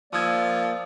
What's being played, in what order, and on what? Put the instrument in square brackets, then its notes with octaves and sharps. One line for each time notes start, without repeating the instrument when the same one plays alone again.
[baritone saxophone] F3 [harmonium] A#3 D5 [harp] D#6 E6 G#6